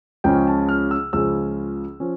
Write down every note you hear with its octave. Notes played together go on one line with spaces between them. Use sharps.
C#2 C#3 F3 C#4 G5
A5
F6
E6
C#2 C#3 F3 C#4 E6
F3 C#4